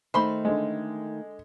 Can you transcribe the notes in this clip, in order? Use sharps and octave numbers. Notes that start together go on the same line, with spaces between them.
D#3 A3 D#4 C5 B5 C6
D3 G#3